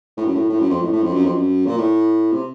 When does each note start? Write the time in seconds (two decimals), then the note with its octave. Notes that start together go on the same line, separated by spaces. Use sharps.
0.17 A2
0.25 F#2
0.35 A2
0.50 A2
0.59 F#2
0.70 F2
0.82 A2
0.93 A2
1.03 F2
1.13 F#2
1.24 F2
1.35 F#2
1.66 A#2
1.78 A2
2.33 C3